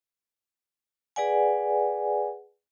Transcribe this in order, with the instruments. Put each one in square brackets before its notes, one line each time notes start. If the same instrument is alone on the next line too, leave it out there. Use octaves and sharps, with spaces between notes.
[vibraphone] G#4 B4 D5 F#5 G#5